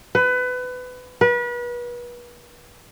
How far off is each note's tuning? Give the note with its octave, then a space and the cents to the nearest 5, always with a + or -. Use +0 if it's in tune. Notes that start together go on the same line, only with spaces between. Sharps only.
B4 +25
B4 -35